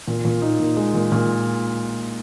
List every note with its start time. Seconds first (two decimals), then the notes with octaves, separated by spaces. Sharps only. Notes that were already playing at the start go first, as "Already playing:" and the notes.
0.08 A#2
0.25 A#2
0.42 D#4
0.60 A#2
0.77 G#3
0.94 A#2
1.12 A#2